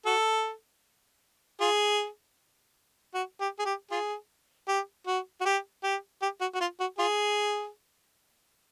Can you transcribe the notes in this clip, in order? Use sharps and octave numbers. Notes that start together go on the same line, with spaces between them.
F#4 A4
F4 G#4
F#4
G4
G#4
G4
F4 G#4
G4
F#4
F#4
G4
G4
G4
F#4
F#4
F4
F#4
F4 G#4